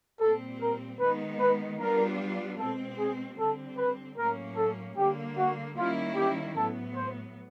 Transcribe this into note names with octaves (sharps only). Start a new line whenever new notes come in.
A#2 G3 C4 A4
A#4
D#3 G#3 B3 D#4 B4
B4
G3 B3 D4 F4 A#4
B2 G#3 C4 A4
G#4
D3 G3 C4 A4
B4
A2 F#3 A#3 C#4 A#4
A4
D3 G3 A#3 G4
F#4
D#3 G3 A#3 C#4 E4 F4
G4
A2 F#3 B3 A4
C5